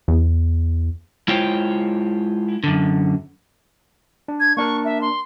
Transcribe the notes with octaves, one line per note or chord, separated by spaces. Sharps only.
E2
G#3 E4 F4 C5 C#5 G5
F#2 D3
D4
G#6
A#3 D4 A#4 C#6
E5
C6